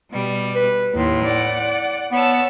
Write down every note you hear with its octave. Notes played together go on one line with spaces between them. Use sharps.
B2 G3
B4
D#2 A2 C6
D5 F#5
B3 C#5 A5 E6